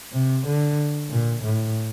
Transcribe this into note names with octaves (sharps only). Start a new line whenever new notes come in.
C3
D3
A#2
A2